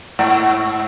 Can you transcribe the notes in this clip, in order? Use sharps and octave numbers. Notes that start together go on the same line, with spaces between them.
G#2